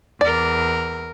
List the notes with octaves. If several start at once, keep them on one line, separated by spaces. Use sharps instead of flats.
E2 A#4 D5